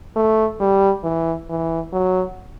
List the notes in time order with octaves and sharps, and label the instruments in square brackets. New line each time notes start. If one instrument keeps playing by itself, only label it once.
[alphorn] A3
G3
E3
E3
F#3